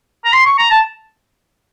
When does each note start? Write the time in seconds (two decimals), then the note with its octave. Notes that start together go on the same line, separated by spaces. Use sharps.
0.25 A#5
0.33 C6
0.46 C#6
0.58 A#5
0.71 A5